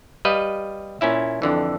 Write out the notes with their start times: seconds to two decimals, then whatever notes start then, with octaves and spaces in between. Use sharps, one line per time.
0.25 G3 B4 D#5 F5
1.01 A#2 C#4 E4 E5
1.42 F2 D3 E3